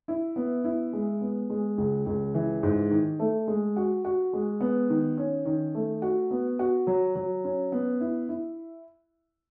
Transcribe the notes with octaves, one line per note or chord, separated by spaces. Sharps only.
E4
B3
E4
G#3
B3
G#3
C#2
C#2
E3
G#2
D#3
A3
G#3
F#4
F#4
G#3
B3
D#3
C#4
D#3
A3
F#4
B3
F#4
F#3
F#3
C#4
B3
E4
E4